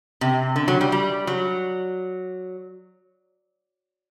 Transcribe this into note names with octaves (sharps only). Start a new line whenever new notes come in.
C3
D3
F#3
G3
G3
F#3